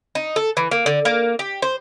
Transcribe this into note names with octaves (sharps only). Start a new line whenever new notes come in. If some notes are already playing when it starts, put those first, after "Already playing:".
D#4
A4
E3
A#3
D3
A#3
G4
C5